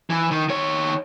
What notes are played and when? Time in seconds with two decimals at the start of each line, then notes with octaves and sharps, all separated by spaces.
0.10 E3
0.31 D#3
0.49 D#3 C#5